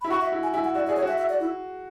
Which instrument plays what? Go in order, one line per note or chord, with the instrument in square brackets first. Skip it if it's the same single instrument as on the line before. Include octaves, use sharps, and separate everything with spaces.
[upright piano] E4 [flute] B5
[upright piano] F#4 [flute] C#6
[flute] E5
[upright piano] E4
[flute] G#5
[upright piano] E4 [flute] G#5
[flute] F#5
[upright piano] F#4 [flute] D5
[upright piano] G#4 [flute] D5
[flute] C#5
[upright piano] F#4
[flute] E5
E5
D5
E4